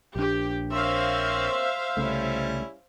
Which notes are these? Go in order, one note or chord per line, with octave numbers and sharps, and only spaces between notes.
A#1 D4 G4
A#3 C4 C5 C#5 E5 F5
C2 C#3 G3 A3 C#4 E4